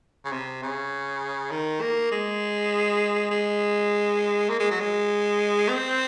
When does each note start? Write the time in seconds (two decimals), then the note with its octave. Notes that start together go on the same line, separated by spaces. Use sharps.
0.25 C#3
0.32 C3
0.62 C#3
1.51 D#3
1.81 A#3
2.11 G#3
3.31 G#3
4.49 A#3
4.60 G#3
4.71 F#3
4.80 G#3
5.68 C4